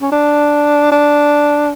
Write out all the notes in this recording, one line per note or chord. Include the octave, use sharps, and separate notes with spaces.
C#4
D4
D4